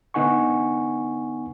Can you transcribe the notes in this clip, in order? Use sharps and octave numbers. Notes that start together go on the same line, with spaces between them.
D3 B3 D#4 F#5 G#5 C#6